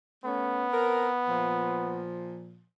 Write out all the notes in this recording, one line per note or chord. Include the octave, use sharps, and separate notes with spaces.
A3 B3 C#4
C4 A#4
A#2 F3